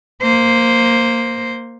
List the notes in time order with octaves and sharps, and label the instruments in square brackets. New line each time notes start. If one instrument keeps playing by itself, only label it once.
[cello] A#3 C5